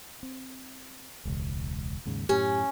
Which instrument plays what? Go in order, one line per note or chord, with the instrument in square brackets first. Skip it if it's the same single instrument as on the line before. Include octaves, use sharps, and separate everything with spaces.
[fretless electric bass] C4
E1 C#2
D#2 G#2 C#3
[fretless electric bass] F#2 A2 [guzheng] C#4 [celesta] G4